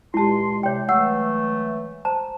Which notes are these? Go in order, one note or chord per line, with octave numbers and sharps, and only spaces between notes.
C#2 A#2 G#3 E4 G4 A5 C6
C3 C#5 G5
E3 F#3 A3 F#5 E6
C5 A5 A#5